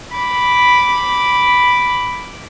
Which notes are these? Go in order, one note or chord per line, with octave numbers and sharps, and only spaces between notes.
B5 D6